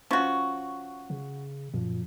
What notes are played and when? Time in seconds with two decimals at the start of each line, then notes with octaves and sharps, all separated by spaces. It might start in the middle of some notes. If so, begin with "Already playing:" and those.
0.11 F3 C#4 F#4
1.10 C#3
1.74 F#2 A#2 F3